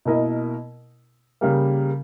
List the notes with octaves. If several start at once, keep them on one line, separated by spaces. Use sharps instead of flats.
B2 A#3 E4 A#4 D#5
C#3 G3 A#3